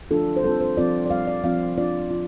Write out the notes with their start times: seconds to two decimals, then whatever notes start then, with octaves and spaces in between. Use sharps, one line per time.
0.11 F3 D4 F4 A4
0.37 C5
0.44 G3 C4 F4 A4
0.61 C5
0.77 F3 C4 F4 D5
1.06 D5
1.10 G3 C4 F4 F5
1.27 D5
1.44 F3 C4 F4 F5
1.78 F3 D4 F4 D5
2.11 F4